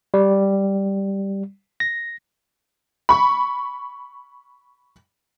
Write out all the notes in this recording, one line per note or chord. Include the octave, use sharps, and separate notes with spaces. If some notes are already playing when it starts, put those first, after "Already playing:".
G3
A#6
B5 C#6